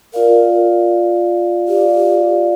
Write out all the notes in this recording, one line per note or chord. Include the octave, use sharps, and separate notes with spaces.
F4 A#4 D5 F5
F4 G4 D5 F5